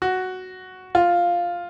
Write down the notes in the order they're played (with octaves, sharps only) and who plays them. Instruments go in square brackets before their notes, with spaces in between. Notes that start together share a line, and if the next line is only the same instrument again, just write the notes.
[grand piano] F#4
F4